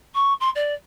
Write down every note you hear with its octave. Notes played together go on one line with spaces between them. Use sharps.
C#6
C6
D5